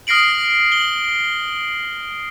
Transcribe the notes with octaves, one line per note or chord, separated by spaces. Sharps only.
D#6 F6 A#6 C7 D7 F#7
F#7 G7